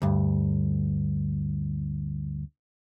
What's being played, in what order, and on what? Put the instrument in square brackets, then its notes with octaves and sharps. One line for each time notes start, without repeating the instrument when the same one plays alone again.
[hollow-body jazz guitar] D2 G2